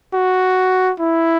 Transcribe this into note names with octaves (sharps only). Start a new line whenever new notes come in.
F#4
E4